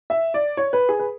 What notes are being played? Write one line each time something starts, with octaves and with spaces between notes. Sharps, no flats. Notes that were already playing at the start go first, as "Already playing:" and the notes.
E5
D5
C#5
B4
G#4
B4